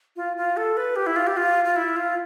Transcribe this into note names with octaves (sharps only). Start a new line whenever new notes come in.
F4
F4
A4
B4
G4
E4
F4
G4
F4
F4
E4
F4